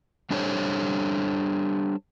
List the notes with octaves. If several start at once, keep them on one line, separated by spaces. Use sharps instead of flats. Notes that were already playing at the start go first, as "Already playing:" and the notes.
G3 D4 G4 A4 C5 C#5